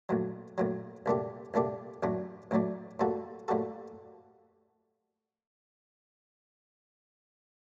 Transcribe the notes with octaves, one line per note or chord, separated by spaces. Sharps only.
A#1 A2 F#3
A#1 A2 F#3
C2 A#2 A3 D4 G4
C2 A#2 A3 D4 G4
A1 A2 F#3 A3 D4
A1 A2 F#3 A3 D4
A2 G3 A#3 F#4 A4
A2 G3 A#3 F#4 A4